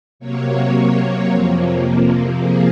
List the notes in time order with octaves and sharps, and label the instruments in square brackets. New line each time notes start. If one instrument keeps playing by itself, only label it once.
[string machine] C3 F#3 A#3 C#5
F2 C3 F3 A#3
C3 F3 A#3 G#4